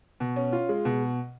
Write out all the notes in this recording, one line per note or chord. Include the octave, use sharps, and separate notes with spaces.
B2
C#4
F4
G#3
B2